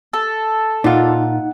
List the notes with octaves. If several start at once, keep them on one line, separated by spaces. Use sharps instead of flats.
A4
A#2 D#4 F4 F#5